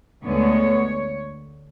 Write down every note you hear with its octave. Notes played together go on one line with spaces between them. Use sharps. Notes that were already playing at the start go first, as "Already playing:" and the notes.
D2 D3 G#3 B3 C#5